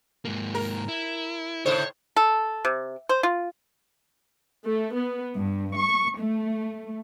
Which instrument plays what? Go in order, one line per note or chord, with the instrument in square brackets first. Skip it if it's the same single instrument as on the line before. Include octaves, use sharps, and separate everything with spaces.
[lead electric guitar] G#2 A#3
[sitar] A#4
[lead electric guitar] E4
[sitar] A2 C#3 C5 [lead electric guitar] C#5
[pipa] A4
C3
C5
F4
[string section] A3
B3
G2
C#6
A3